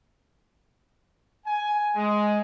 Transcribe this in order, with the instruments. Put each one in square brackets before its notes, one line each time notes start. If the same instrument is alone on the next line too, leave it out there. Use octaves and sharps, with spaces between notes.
[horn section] G#5
G#3